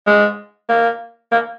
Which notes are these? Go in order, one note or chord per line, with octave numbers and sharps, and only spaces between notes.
G#3
A#3
A#3